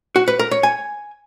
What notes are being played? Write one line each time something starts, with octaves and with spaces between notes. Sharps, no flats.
F#4
B4
A#4
C#5
G#5